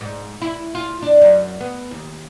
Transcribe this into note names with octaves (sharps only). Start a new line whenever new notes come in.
G#2
E4
F4
D4
F#2
B3
D#2